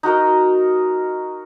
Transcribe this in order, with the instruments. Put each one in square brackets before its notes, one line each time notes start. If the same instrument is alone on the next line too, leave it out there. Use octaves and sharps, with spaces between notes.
[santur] D#4 F#4 A#4 D#5